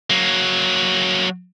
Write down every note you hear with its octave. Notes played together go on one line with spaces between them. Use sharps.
F#3 A#3